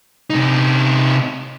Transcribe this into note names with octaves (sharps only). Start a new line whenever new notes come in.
C3 D#4